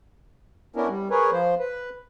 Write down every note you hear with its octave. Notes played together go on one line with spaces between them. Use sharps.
B3 C#4 D4 E4 A#4
G3
G#4 A#4 B4 C#5
F3 C5
B4